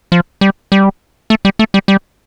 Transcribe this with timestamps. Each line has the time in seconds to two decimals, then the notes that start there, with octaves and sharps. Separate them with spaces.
0.12 F3
0.41 G3
0.72 G3
1.30 A3
1.45 G3
1.59 A3
1.74 G3
1.88 G3